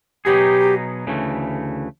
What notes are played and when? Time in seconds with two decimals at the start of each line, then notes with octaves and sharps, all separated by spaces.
0.25 B2 F#3 B3 D#4 G4 G#4
1.07 D2 C#3 E3 A3